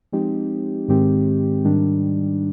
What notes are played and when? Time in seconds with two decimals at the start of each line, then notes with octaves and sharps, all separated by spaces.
0.12 F3 G#3 C4 D#4 G4
0.88 G#2 D#3 G#3 C4 G4
1.64 G#2 D#3 G3 D4